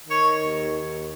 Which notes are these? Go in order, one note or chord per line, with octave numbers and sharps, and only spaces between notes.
D#3 C#5
D#2